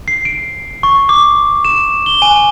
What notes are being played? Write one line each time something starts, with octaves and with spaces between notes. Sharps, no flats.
C7
D7
C#6
D6
E7
G7
G#5